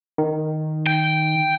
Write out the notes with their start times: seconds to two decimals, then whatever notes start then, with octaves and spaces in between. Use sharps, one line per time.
0.18 D#3
0.87 G5